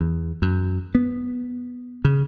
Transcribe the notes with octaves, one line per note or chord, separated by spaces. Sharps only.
E2
F#2
B3
C#3